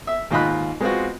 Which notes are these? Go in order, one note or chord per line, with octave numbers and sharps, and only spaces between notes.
E5
D#2 G#2 F4 D#5 B5 F#6
G#3 B3 C4 F4 F#4